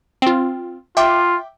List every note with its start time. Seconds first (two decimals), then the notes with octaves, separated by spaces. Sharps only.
0.22 C4 F4
0.97 F4 E5 G5 D6